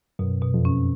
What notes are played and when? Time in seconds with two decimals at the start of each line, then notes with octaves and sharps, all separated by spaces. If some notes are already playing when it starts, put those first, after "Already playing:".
0.19 F#2 B2
0.42 B2
0.54 F2
0.65 C#4